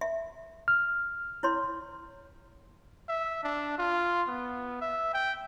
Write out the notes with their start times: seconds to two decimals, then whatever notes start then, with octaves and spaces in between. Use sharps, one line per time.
0.01 E5
0.68 F6
1.43 E4 C#5 C6
3.08 E5
3.43 D4
3.78 F4
4.28 B3
4.81 E5
5.14 G5